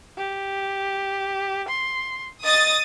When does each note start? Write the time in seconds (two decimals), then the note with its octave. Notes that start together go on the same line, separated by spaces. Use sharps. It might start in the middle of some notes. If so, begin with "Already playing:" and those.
0.18 G4
1.68 C6
2.44 D#5 D#6 A6